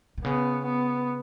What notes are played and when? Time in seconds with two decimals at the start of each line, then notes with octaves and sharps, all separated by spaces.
0.18 B2
0.24 C#3 B3
0.65 B3